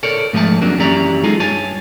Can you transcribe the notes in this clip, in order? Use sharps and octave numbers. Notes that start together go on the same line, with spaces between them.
A4 A#4 C#5 D5
G#2 F3 A3 B4 A5
F2 F#3 A#3 D4
F#2 E3 C#4 G4 D5 A#5
G#3 D#4 F4 G#4 A4
G2 C#5 G#5 A5